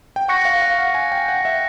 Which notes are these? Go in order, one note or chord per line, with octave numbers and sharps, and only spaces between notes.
G5
F#5 C#6 F#6 A#6 C#7
F5
F5
F#5
G#5
G5
F#5
E5